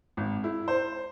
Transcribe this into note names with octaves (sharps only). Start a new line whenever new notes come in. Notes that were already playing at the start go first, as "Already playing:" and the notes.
G#1
E4
C5